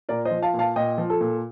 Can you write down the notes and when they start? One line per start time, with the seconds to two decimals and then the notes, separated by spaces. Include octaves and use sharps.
0.09 A#2 A#4 D5
0.25 C5 D#5
0.31 F3
0.42 F5 A5
0.54 A#2
0.59 F5 A5
0.76 A#2 D#5 G5
0.98 F3
1.10 A4
1.21 A#2